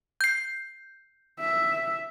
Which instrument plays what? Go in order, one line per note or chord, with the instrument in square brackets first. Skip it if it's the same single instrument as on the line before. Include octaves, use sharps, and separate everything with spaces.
[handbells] G6 C7
[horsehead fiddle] E5